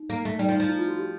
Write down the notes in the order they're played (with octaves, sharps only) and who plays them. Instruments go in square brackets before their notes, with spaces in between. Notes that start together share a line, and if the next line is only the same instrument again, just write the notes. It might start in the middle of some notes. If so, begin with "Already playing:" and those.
Already playing: [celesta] D#4
[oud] A#3
A3
[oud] G3 [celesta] D#4
[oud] F3
[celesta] D#4
[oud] F3
[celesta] E4
F4
F#4
G4